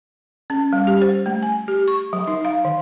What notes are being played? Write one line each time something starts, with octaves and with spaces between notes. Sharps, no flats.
C#4
G3
G4
C5
A3
G#5
G4
C#6
F#3
D#4
F5
D#3